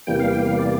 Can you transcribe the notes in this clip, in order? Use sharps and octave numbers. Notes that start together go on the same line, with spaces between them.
E2 C3 E3 G3 A#3 G5
F5
G5
F5
D5